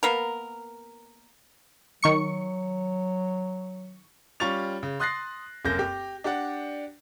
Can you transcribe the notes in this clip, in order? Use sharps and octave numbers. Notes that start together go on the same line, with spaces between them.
A#3 B3 A#4
D#3 F#3 C#6 C#7
G3 C#4 F4 C#6 A6 F7
C#3
C6 D#6 F#6 A6 A#6 C7
F1 F#2 A#3 G6 A#6
G4
D4 G4 D5 F#5